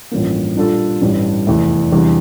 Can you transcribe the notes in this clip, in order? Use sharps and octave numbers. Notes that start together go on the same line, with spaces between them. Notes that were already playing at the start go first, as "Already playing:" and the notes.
A1 G2 F3 A#3
A#2 G3 D4 F4 A4
A1 G2 E3 G3 D4
F1 E2 E3 A3 E4
E2 C3 E3 G3 D4